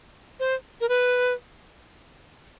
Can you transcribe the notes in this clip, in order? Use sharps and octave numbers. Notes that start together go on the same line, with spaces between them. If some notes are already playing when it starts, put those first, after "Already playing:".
C5
A#4
B4